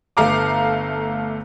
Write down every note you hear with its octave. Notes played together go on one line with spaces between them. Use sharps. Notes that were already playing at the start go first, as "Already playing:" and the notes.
G1 A3 F5 A#5 D6